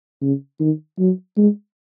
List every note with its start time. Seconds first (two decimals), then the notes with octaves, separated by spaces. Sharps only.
0.22 C#3
0.60 D#3
0.99 F#3
1.37 G#3